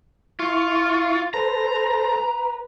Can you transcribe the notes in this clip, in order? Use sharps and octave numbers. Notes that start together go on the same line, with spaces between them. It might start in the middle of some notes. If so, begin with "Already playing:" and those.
E4 F4 C#6
A4 B4 C5 A#5
B4